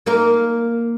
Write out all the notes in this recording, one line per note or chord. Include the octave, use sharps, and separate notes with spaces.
A#3 D#4 A#4